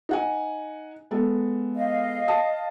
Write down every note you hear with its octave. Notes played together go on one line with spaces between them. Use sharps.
D#4 F#5 G#5
G#3 B3 A4
D#5 F5
A5 D#6